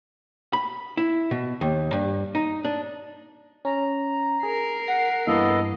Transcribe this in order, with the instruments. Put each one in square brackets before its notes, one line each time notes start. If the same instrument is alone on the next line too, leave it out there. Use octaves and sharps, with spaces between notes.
[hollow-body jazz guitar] B5
E4
B2
D#2
G2
D#4
D4
[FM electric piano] C#4 [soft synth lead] A#5
[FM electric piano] G#4 [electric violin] A#4 C7
[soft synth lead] F#5 [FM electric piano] A#6
[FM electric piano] G2 E3 [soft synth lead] A#3 [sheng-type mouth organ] B3 A4 D#5